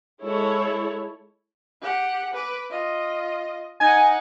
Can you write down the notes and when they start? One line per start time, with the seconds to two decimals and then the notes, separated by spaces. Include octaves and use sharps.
0.22 G#3 E4 A4 C#5
1.82 G4 F#5
2.34 B4 D6
2.70 F4 D#5
3.80 D#4 F#5 G#5